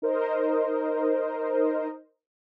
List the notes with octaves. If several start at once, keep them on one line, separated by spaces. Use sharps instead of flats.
D#4 A#4 C5 D#5